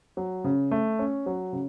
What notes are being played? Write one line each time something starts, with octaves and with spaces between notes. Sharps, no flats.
F#3
C#3
A3
C#4
F#3
C#3